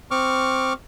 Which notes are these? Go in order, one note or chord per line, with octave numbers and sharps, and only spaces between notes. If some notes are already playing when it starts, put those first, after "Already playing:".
C4 C#6 D6 F6